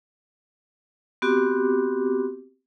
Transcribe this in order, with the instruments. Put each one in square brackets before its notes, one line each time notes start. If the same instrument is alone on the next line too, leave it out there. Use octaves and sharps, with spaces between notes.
[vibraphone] B3 C4 F#4 G4 D6